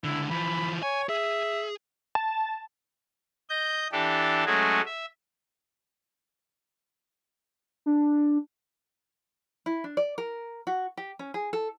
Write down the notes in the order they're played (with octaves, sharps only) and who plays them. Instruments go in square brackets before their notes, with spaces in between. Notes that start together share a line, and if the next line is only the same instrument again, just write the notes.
[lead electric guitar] C#2 D3 [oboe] E4
[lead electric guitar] E3 F3 [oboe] B5
[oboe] C#5 [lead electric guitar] G#5
[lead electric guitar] G#4 [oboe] E5
[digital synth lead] A5
[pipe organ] D#5 G6
E3 D4 G4 A4
F#3 G#3 A3 C#4 F#4 G#4
E5
[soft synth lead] D4
[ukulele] E4
D4
D5
A#4
F#4
G4
C#4
G#4
A4